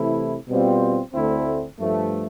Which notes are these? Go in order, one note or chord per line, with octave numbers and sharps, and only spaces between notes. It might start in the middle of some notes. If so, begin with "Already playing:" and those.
Already playing: C3 E3 A3 E4
B2 G3 C4 F4
D2 D3 A3 C4 E4
G2 F3 A3